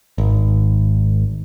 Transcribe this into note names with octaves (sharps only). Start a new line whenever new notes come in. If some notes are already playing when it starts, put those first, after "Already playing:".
G#1